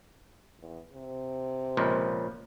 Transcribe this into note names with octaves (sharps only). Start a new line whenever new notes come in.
E2
C3
C#2 A#2 F3